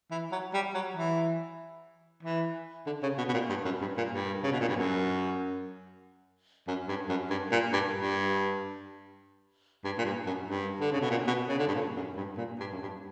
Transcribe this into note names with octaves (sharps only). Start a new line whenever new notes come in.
E3
F#3
G3
F#3
E3
E3
D3
C#3
B2
B2
A#2
G2
F#2
G2
A#2
G2
C#3
B2
A#2
G2
F#2
F#2
G2
F#2
G2
A#2
G2
G2
G2
A#2
G2
F#2
G2
D3
C#3
B2
A#2
B2
C#3
D3
G2
A#2
F#2
G2
A#2
G2
F#2
G2